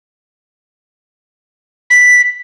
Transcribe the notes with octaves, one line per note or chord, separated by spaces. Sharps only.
B6